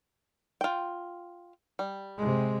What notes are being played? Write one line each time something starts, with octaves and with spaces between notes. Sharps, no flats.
F4 G5
G3
C3 G#3